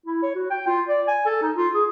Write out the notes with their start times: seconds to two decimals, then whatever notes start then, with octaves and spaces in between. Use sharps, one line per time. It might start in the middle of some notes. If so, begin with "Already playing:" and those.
0.06 E4
0.23 C#5
0.35 F#4
0.50 G5
0.67 F4
0.88 D5
1.08 G#5
1.26 A4
1.42 D#4
1.56 F4
1.75 G#4